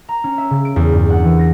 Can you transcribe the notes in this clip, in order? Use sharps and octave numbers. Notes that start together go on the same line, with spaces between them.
A#5
C#4
E5
C#3
D7
E2
G2
F#5
E3
A#6